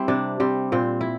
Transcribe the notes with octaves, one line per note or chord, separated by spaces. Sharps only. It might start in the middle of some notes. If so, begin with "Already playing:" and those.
Already playing: G3 C4 E4
C3 D4
G3 C4
A#2 C4
E4